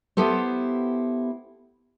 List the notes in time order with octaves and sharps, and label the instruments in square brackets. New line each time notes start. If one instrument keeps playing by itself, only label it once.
[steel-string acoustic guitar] B3 E4 G4 A4 C5